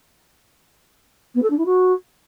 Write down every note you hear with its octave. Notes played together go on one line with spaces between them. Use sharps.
B3
A4
D4
E4
F#4